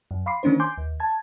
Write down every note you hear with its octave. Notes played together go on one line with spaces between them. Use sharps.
F#2
F5 B5 C6 D6 C7
D#3 A#3 C#4 D4 C5
G#5 C6 D6 G6
D#2
A5 G#6